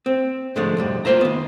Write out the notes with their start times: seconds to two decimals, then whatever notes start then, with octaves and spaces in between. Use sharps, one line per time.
0.06 C4
0.56 G#2 D3 F3 G#3 A3
0.77 B1 F2 G3
1.05 A#3 F4 C5 E5 A#5
1.21 D#3 B3